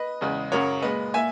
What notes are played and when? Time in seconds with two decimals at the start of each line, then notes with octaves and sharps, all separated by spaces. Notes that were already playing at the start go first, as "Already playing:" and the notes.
Already playing: B4 D#5
0.21 E2 C#3 G#3
0.52 F#2 C#3 F#3 A#4 C#5
0.82 A#2 G#3 B4 D#5
1.14 A#2 E5 G#5